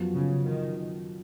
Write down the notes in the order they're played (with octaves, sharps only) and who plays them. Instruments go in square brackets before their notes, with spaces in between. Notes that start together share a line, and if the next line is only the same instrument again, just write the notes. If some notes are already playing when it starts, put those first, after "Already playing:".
Already playing: [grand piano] F#2 F3 B3 F#4
[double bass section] C#3
D#3